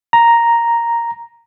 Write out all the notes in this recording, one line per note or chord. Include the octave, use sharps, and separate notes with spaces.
A#5